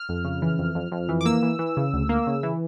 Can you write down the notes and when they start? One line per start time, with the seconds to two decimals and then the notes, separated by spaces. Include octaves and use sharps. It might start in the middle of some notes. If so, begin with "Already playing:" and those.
Already playing: F6
0.09 F2
0.25 C#3
0.42 E3
0.59 F2
0.75 F2
0.92 F2
1.09 E3
1.21 D6
1.25 A#3 E6
1.43 E3
1.59 E3
1.77 C#3
1.93 D2
2.09 A#3
2.27 C#3
2.43 E3